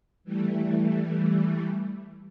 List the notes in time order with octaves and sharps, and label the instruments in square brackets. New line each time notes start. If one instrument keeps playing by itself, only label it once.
[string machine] E3 G3 A3